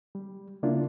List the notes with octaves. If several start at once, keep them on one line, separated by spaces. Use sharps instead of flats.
G3
C#3 A#3 D4 E4 F4